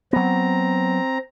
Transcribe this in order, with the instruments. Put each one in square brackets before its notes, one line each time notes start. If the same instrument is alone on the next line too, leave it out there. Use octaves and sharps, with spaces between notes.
[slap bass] F#3 B3 [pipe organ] C4 A#5